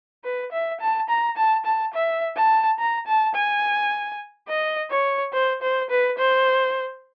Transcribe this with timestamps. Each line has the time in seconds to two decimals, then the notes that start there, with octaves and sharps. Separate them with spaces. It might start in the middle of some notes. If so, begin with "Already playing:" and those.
0.24 B4
0.52 E5
0.80 A5
1.09 A#5
1.37 A5
1.65 A5
1.93 E5
2.36 A5
2.79 A#5
3.07 A5
3.35 G#5
4.48 D#5
4.90 C#5
5.33 C5
5.62 C5
5.90 B4
6.18 C5